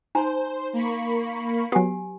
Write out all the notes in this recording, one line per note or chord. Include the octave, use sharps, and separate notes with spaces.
D#4 C5 G#5 A#5
A#3 B5 C#6
F#3 B3 G4 G#5